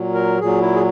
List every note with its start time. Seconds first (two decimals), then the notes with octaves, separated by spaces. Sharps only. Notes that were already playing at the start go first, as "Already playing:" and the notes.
Already playing: A#2 F#3
0.14 A#4
0.41 A#2 F#3 G#4
0.61 E4
0.75 G#4